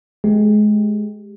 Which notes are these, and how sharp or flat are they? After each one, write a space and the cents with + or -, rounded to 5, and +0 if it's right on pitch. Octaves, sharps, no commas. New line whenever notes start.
G#3 +25 G4 +15